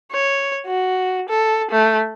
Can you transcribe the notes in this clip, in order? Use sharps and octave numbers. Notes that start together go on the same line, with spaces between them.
C#5
F#4
A4
A3